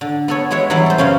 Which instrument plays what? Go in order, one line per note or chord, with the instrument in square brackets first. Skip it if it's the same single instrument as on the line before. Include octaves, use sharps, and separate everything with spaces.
[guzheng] D3
B3 A4 C#5
G#3 F#4 C#5 E5
E3 F#3 G3 B3 E4
A4 C5
F#2 C#3 C#4 F5